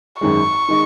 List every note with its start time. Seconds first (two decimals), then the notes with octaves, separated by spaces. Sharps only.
0.21 G#1 F#2 D#3 G#3 C#6
0.68 D#3 G#3 D#4